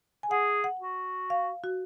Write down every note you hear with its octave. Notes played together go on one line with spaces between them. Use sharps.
G#5
G#4 F#5
F#5
F#4
F5
F#4